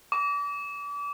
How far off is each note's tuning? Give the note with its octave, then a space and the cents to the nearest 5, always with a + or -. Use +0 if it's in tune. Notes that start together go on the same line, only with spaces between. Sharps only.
D6 -35